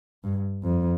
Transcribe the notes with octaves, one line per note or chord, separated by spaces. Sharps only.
G2
F2